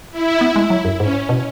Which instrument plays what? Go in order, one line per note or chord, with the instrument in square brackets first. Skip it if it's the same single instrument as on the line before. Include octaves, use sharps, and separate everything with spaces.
[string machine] E4
[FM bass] B3
G#3
F#3
F#2
[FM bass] G#2 [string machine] C#4
[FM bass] B2